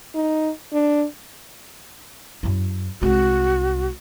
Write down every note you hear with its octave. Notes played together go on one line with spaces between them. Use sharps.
D#4
D4
F#2 E4
C2 G#3 F#4